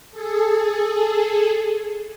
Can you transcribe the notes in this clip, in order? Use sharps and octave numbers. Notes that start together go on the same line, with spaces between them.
G#4 A4